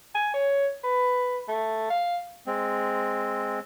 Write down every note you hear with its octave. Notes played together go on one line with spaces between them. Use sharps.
G#5
C#5
B4
A3
F5
G#3 C4